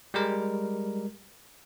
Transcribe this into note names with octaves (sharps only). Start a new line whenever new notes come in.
G3 G#3 A#4